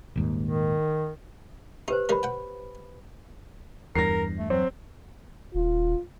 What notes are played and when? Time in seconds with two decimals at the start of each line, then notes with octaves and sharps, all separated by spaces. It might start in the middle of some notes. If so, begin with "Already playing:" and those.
0.16 D#1 D#2 G#2
0.43 D#3
1.88 D#4 G4 B4 C5
2.09 D#3 G3 A#4 C#5 B5
2.23 F#5 G5
3.95 E2 G2 A#4 A#6 C7
4.39 A3
4.50 F#3 C4
5.55 D#1 F4